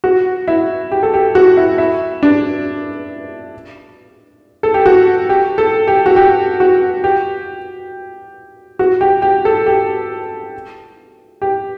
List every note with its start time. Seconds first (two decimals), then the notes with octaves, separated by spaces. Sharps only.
0.04 F#4
0.48 E4
0.92 G4
1.03 A4
1.14 G4
1.35 F#4
1.57 E4
1.78 E4
2.23 D4
4.63 A4
4.74 G4
4.86 F#4
5.29 G4
5.58 A4
5.87 G4
6.06 F#4
6.16 G4
6.60 F#4
7.04 G4
8.79 F#4
9.01 G4
9.22 G4
9.45 A4
9.66 G4
11.42 G4